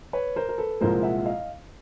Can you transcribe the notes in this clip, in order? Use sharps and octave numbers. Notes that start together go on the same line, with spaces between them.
B4 C#5
A#4 C5
A#4
A4 B4
C2 A#2 F3 G#3 A#4 C5
E5 F#5
D#5 F5